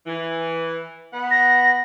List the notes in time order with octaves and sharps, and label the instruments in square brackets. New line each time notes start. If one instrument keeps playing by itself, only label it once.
[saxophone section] E3
B3 F#5
[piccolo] A#6